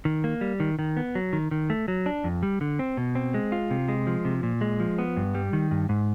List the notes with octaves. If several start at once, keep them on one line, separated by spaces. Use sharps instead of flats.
D#3
A#3
G3
D#3
D#3
B3
F#3
D#3
D#3
A3
F#3
D4
F2
G3
D3
C4
B2
C4
G#3
F4
C3
G#3
F3
C3
A#2
G#3
F3
B3
G2
G3
D#3
G2
G#2